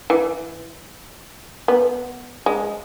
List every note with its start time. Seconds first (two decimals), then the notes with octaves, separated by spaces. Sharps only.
0.10 E3
1.68 B3
2.46 G#3